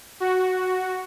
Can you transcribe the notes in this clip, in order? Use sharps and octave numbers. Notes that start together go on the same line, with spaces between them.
F#4